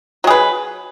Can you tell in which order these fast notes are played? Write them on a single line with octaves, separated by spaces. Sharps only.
F#3 G#4 B4